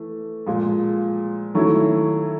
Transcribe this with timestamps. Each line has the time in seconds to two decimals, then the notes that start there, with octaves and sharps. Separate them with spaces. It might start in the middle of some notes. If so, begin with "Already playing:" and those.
Already playing: E3 A3
0.46 A#2 F3 G#3
1.54 D#3 F#3 A3 C#4 E4